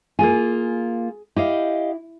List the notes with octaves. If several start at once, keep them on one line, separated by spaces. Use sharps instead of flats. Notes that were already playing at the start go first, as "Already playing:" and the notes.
A#3 F4 G#4 G#5
E4 G4 D#5 F5